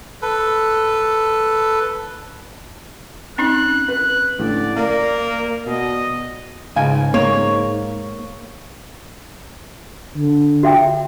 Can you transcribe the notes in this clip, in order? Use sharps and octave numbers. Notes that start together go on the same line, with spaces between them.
A4 B4
C4 C#4 D#4 F#6
B4 F#6
A1 D3 D5
A#3 A#4 D5
B2 D#5
C#2 G#2 F5 G#5
A#3 C#5
D3
F#4 E5 G5